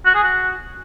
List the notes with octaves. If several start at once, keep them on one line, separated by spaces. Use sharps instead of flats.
F#4
G#4
F#4